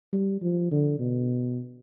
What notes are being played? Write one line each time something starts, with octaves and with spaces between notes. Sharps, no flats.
G3
F3
D3
B2